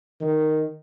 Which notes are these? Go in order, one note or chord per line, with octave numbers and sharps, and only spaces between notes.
D#3